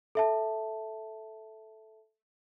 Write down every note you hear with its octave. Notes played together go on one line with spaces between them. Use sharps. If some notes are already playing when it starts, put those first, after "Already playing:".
A4 E5 A5